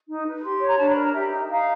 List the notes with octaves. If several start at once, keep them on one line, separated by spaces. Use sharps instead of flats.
D#4
B4
G4 C6
C#5
A#5
D4 A5
B5
A#4
A#5
G4 E5
D#4
D#4 F5